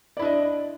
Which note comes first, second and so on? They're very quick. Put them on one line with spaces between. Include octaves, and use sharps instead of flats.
D5 E4 D4 D#5